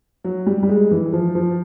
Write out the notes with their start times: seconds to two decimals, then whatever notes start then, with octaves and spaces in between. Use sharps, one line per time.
0.24 F#3
0.46 G3
0.63 G3
0.69 G#3
0.91 E3
1.13 F3
1.35 F3